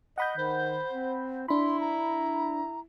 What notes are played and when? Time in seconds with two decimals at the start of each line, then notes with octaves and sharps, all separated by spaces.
0.18 D#5 F#5 B5 G6
0.37 D#3 C5
0.92 C4
1.48 D4 E4 B5 C6
1.80 A#5